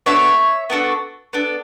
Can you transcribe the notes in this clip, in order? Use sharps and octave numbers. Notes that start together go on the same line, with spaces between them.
B3 D4 F#4 A4 C#5 E5
B3 D4 F#4 A4
B3 D4 A4